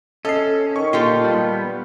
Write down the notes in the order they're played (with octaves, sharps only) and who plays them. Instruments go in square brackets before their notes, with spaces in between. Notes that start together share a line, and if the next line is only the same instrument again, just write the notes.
[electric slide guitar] C#4 [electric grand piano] A4 C7 [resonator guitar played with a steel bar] D#5
[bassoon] D#3 [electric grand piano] C#6
[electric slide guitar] A#2 [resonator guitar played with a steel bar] F4 G4 A4
[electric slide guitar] G3 B3